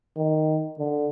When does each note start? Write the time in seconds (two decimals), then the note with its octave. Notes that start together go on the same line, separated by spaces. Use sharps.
0.17 D#3
0.79 D3